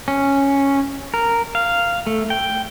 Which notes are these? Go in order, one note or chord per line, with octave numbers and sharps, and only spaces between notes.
C#4
A#4
F5
A3
G5